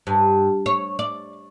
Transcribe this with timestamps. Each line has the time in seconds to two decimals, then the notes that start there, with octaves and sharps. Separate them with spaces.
0.07 G2
0.66 C#5
0.99 D5